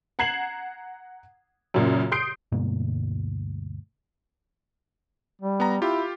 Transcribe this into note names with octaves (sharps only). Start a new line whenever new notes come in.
F#5 A#5 G#6 C7 E7 F#7
F#2 A#2 C#3
C6 D#6 G6 C7 D7
D2 G2 B2 A#3
G3
B3 A#5
E4 F4 G4